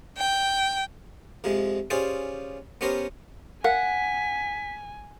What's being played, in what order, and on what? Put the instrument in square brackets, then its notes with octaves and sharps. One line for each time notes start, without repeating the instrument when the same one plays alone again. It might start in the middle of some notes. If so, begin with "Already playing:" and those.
[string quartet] G5
[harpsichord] F2 C3 F3 G#3
C#4 F4 G4 G#4 C5 D5
B3 C#4 G4 A#4 C5
[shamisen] A#4 F5 [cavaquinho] F#5 [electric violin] G#5 [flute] B6